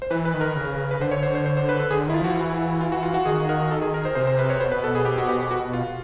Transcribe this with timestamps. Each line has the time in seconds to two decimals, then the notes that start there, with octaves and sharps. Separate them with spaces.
0.02 C5
0.10 E3 B4
0.25 B4
0.34 D#3
0.41 A#4
0.56 C#3
0.91 B4
1.00 D3 C5
1.11 C#5
1.23 C5
1.35 C5
1.46 C5
1.57 C5
1.69 B4
1.80 A4
1.90 D3 G#4
2.06 D#3 E4
2.14 F4
2.21 F3 F#4
2.36 E3
2.81 F4
2.92 F#4
3.03 F4
3.14 F#4
3.25 D#3 G#4
3.49 A#4
3.71 A4
3.82 G#4
3.94 A#4
4.05 C5
4.15 C3 C5
4.27 C5
4.39 B4
4.50 C#5
4.60 B2 C5
4.72 B4
4.84 A4
4.95 G#4
5.05 G4
5.18 F#4
5.29 G4
5.51 F#4
5.73 F4